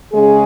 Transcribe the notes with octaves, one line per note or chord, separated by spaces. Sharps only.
C#3 G#3 C#4 G#4